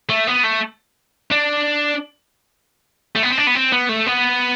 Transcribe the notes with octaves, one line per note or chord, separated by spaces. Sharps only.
A3
B3
A3
D4
A3
B3
C4
D4
B3
C4
B3
A3
B3